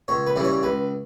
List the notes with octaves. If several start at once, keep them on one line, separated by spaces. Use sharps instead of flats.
C#2 C#5
B4
C#3 E3 G3
C#5
C#2 B4